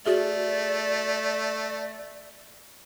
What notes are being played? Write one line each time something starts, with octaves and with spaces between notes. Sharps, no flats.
A3 F#4 G#4 D5 E5